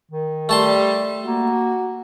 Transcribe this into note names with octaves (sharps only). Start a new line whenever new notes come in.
D#3
G3 A3 A5 C6
A#3 F#4